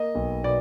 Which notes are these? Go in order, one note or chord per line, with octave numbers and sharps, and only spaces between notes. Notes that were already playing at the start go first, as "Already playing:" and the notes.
Already playing: A#3 D#5
B1
B2 D5